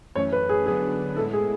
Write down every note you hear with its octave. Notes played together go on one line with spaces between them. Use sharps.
F#2 E3 A3 C#4 C#5
B4
G#4
D3 F#3 B3 D4 G#4
A2 G#3 B3 E4 A4
G#4